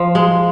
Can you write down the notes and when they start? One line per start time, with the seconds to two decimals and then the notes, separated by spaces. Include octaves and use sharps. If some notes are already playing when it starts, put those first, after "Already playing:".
Already playing: F3
0.15 G#3